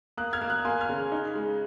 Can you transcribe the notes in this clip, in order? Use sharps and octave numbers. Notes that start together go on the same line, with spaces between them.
A#3 D#6 F#6
F6 G#6
A#3
D#6 F#6
A#3 G#5 C6
F6 G#6
C#3
D#4
G#3